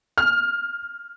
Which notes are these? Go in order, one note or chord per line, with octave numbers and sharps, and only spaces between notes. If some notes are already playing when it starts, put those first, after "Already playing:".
F6